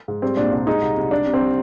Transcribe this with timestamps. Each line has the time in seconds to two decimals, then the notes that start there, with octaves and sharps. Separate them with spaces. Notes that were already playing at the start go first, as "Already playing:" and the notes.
0.08 G#2
0.22 G3 C4
0.37 A#2 D4
0.52 C2 D4
0.67 G#3 D#4
0.82 C2
0.97 C2
1.11 G3 D4
1.26 C3
1.34 C4
1.41 G3